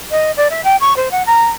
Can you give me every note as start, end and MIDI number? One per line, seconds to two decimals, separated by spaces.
0.11 0.31 75
0.37 0.48 74
0.50 0.61 76
0.64 0.76 79
0.81 0.96 85
0.96 1.11 72
1.11 1.23 78
1.26 1.45 82